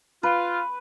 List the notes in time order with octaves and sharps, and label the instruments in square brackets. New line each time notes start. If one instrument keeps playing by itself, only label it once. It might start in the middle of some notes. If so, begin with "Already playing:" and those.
[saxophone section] F4 [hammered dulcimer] B4